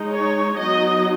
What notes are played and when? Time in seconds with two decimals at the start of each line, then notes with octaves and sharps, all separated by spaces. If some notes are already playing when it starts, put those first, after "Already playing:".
Already playing: G#3 D#4
0.11 C#5
0.56 F#3 B3 D#4 D#5